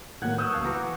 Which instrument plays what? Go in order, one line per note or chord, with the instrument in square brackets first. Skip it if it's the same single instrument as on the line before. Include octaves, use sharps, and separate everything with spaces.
[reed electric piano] A2 D#3 F#3 [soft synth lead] A#3 [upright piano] F#5 F#6 G#6
[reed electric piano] B4 [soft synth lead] C#6 [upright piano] D#6 E6 G6
[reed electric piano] C#2 F5 A5
[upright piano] E3 [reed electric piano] F#4 A#5 D6